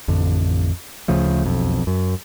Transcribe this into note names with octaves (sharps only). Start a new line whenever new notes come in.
A1 F2 D3
D2 C#3 F3 A3
E1 B1 F2
F#2